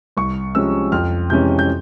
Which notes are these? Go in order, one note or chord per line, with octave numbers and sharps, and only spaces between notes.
C2 C#6
C3 F3 G#3 C#4 E6
F2 F6
C3 E3 G#3 C#4 G6
G6